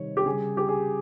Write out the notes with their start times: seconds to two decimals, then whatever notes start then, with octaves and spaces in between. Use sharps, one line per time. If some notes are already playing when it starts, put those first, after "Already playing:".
Already playing: C3 D#3 G3 C#5
0.17 G4
0.25 C#3 G3 G#4
0.57 G4
0.69 G#4